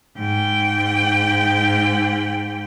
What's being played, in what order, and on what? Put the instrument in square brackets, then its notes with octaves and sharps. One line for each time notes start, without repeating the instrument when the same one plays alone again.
[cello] G#2 G5